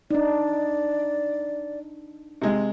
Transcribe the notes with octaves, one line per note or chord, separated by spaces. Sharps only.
D4 D#4 D5
C3 G#3